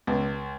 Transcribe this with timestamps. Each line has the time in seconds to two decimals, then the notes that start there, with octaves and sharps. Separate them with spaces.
0.07 C#2